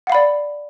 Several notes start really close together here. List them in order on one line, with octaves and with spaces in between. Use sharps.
F#5 F5 B5 D5